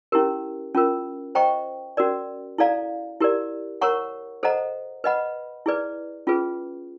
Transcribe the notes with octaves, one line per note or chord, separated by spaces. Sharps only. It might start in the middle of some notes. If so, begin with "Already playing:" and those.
C#4 E4 G4 A#4
C#4 F4 A#4
C5 D#5 G5 A#5 C#6
C#4 F#4 A#4 D5
E4 A4 D5 F5 A#5
E4 G4 A#4 D5
A#4 C#5 F#5 A#5 C#6
A4 C5 D#5 F#5 A#5
B4 D#5 F#5 B5
E4 G#4 B4 D5
C#4 F4 G#4 B4